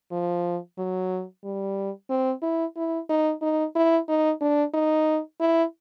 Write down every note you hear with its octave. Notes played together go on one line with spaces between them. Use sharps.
F3
F#3
G3
C4
E4
E4
D#4
D#4
E4
D#4
D4
D#4
E4